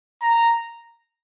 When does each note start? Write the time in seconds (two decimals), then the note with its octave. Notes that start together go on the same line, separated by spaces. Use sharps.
0.22 A#5